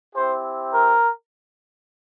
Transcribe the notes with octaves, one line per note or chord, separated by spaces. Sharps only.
C4 E4 G4 C5
A#4